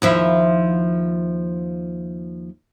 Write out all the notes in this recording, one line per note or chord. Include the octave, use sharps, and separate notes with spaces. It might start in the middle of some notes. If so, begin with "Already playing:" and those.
D#2 F3 E4